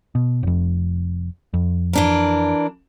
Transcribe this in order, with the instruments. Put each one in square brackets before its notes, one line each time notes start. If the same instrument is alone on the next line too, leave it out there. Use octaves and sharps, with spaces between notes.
[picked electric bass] B2
F1 F2
F2
[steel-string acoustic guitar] E3 D4 A#4